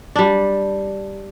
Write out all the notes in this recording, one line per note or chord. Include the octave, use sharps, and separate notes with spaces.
G3 D4